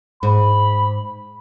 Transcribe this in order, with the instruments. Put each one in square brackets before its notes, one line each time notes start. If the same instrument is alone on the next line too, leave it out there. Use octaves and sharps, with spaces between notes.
[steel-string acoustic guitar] G#2 [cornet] B5